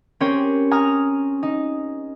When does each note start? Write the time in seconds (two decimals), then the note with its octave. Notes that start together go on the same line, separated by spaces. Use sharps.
0.20 C4 C#4 G4 A#4 C5 C#5
0.71 G#5 A#5 D#6 F6
1.43 D#4